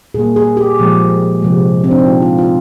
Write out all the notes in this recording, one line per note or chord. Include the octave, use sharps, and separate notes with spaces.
A#2 G3 A#3 G#4
G#4
G4
A#2 F3 G#3
C3 F3 G#3
C4
D4
D#4
A#2 G#3 F4
F4
F4